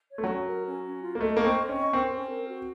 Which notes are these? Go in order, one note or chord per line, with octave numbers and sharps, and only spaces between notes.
C#5
A3
F#3
C#4
A#4
C#4
C#4
F4
A#3
A3 D#5
A#3 C#6
C4
D#5
C#4
C#6
C4 A#4
C#4
A#4
F#4